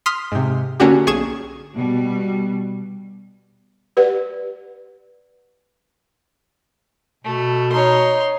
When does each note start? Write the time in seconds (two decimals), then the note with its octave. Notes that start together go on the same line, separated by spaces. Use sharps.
0.06 C6 D#6 F6 B6
0.32 G#2 C3
0.80 D3 A#3 C#4 D4 F#4 G4
1.07 B1 G#4 C#6 G#6 E7
1.74 B2 G3
3.97 G4 B4 D5 F#5
7.24 B2 A3
7.72 D#4 C#5 C6